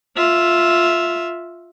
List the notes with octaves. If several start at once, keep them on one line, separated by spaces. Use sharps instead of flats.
F4 E5